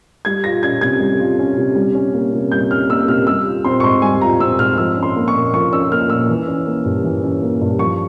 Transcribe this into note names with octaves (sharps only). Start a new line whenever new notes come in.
G3 G#6
F4 A#6
C#4 G#6
C3 G#6
G3
F4
C#4
C3
G3
C#4
A#3
C3
G3 G6
C#4 F6
A#3 E6
C3 F6
G3 E6
F4
C4 C6
C#6
G#2 C6
G3 G#5
F4 A#5
C4 E6
G#2 F6
F3 E6
C#4
C6
A#3
C#6
A#2
F3 C#6
C#4 E6
A#3 F6
A#2 E6
E3
C#4
A#3
G2
E3
C#4
A#3
G2
F3 C#6